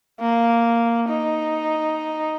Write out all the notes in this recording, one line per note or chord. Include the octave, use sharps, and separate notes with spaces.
A#3
D#4